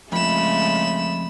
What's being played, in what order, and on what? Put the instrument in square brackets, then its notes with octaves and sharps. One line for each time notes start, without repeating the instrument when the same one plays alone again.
[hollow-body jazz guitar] F2 [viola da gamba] C#3 G#3 A3 [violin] B5 E7